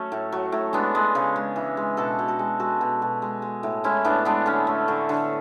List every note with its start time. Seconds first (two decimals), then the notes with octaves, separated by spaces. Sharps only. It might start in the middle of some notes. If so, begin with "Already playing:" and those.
Already playing: F#3 A3 C#4
0.12 A2
0.32 F#3
0.52 A2
0.73 G#3 B3 D4
0.95 G#3
1.15 C#3
1.36 G#3
1.56 E3
1.77 G#3
1.97 B2 F#4 A4
2.19 B2
2.28 F#4 A4
2.39 G#3
2.60 G#3 F#4 A4
2.81 B2
3.02 B2
3.22 G#3
3.42 G#3
3.63 A2
3.84 G#3 C#4 E4
4.05 A2 B3 D4
4.25 G#3 B3 D4
4.46 D3 C#4
4.67 A3
4.88 D3
5.09 D3